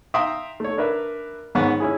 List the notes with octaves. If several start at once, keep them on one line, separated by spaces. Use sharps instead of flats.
E5 F5 G5 A#5 C6 D#6
A3 C#5
D4 A#4 B4 E5
G#2 D#3 B3 C#4 C#6
C#4 E4 G#4